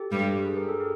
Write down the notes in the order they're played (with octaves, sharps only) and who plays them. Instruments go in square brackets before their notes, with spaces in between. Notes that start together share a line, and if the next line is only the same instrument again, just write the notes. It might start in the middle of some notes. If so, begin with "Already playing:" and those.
Already playing: [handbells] G4 A4
[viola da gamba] G2 G3
[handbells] G#4
G#4 A#4
G4 A4
G#4 A#4